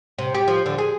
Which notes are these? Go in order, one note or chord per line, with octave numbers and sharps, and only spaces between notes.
C3
G4
F3
D3
G#4